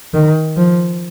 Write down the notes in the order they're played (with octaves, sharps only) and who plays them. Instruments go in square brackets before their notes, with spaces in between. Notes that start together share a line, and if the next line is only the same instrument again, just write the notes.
[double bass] D#3
F3